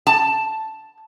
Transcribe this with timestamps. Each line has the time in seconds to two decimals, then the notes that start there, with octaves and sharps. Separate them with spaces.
0.07 A5